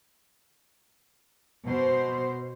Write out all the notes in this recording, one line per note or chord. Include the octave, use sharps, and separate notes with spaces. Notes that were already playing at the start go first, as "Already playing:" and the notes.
B2 C5